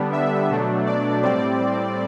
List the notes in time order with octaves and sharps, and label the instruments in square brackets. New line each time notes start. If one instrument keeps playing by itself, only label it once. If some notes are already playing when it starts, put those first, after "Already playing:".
Already playing: [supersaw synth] D3 G3 B3 D4
E5
B2 F#3 A3 D4
D5
A2 G3 C4 D5